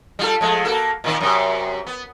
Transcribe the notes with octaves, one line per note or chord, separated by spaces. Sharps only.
G3 F4 A4
F3 G#3 A3
A#3 F#4 A4
A#2 D#3 C4
F#2 C3
B3